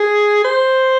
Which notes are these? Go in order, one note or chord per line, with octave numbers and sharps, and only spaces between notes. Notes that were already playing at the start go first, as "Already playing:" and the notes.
Already playing: G#4
C5